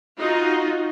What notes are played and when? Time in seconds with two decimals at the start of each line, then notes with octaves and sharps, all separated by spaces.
0.18 D#4 F4 F#4